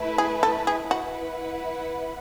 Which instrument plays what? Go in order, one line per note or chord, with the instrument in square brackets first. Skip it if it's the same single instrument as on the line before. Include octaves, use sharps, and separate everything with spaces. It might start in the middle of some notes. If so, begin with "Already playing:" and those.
Already playing: [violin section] A3 E4 B4
[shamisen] G#4
A4
G#4
[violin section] E4 B4 F#5 [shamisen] F#4